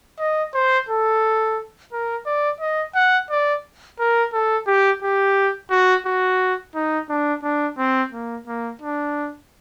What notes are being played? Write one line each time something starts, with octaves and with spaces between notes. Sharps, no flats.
D#5
C5
A4
A#4
D5
D#5
F#5
D5
A#4
A4
G4
G4
F#4
F#4
D#4
D4
D4
C4
A#3
A#3
D4